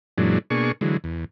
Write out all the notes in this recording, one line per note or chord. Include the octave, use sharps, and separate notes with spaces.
F#2 A#2 E3 F#3 G#3 D4
B2 A#3 D4 G#4 C#6
D3 E3 F#3 G#3
E2